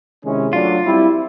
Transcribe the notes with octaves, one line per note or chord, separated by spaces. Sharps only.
C3 D#3 G#3 C#4 E4
F#3 A3 D4 F4
G3 C4 E4